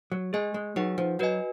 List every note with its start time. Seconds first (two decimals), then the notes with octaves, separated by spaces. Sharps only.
0.12 F#3
0.33 G#3 G#4 D#5 G#5
0.54 G#3
0.76 F#3 D#4 G#4 B4 F#5
0.98 F3
1.19 F#3 F#4 B4 D#5 G#5